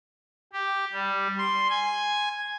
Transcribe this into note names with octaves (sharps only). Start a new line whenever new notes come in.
G4
G3
C6
G#5